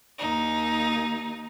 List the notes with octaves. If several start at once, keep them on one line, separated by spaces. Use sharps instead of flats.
D#2 D#4